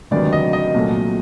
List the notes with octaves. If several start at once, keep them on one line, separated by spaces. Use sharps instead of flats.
D2 C3 D#3 F#3 B3 D5
D#5
D#5
C2 A#2 F#3 A3